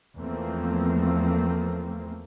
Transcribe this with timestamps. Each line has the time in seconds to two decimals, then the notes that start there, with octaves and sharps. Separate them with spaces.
0.18 E2 F3 A3 A#3 C4